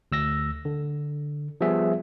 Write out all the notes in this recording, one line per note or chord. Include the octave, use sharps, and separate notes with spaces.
D2 E6 A#6
D3
F3 G3 B3 G#4 E5